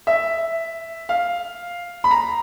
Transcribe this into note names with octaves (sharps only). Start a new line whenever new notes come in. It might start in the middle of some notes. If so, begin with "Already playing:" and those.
E5
F5
B5
A#5